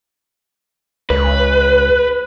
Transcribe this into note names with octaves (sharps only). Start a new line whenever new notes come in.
C#2 B4